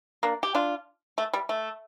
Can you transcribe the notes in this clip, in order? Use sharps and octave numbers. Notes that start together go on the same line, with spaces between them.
A#3 D4
G4
D4 F4
A3
G3
A3